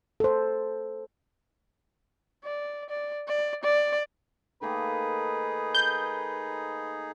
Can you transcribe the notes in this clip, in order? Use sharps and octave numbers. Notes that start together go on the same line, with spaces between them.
A4 C5
D5
D5
D5
D5
D#3 A3 A#3 D#4 G#4 B4
G6